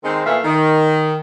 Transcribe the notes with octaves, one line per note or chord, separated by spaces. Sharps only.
D#3 G#3 C4
A#2 E3 A3 B3 E5 F5
D#3